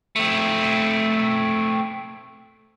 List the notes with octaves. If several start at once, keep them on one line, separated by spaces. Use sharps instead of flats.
A3 C4